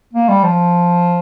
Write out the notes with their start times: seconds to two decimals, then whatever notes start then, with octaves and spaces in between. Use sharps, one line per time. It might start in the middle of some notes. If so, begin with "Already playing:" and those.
0.14 A#3
0.29 G3
0.43 F3